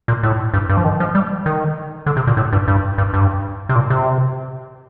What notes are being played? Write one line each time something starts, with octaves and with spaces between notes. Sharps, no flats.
A#2
A2
G2
G2
F3
D#3
F3
G3
D#3
D3
C3
A#2
A2
G2
G2
G2
G2
C3
A#2
C3